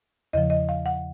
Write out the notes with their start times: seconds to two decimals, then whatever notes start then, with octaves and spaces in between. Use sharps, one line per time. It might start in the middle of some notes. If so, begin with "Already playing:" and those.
0.33 E2 C#3 F3 D#5
0.50 D#5
0.69 F5
0.86 F#5